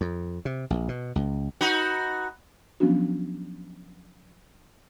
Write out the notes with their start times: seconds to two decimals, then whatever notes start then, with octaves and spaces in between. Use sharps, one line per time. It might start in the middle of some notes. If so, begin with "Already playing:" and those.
0.01 F2
0.45 C3
0.70 A#1
0.88 B2
1.16 C#2
1.61 D#4 F#4 B4
2.80 F3 F#3 B3 C#4 D4 F#4